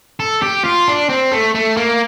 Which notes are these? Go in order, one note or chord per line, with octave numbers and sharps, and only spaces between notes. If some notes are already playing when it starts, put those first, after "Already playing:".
A4
G4
F4
D4
C4
A3
A3
A#3